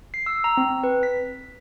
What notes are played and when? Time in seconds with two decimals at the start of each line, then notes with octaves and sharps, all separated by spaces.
0.14 C7
0.26 E6
0.44 A#5
0.57 C4
0.84 B4
1.03 B6